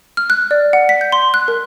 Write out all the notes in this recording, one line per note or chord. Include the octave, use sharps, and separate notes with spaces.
F6
F#6
D5
F#5
B6
G6
C6
F#6
A#4